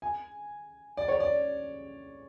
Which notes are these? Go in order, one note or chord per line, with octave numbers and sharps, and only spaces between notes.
G#5
D5
C#5
D5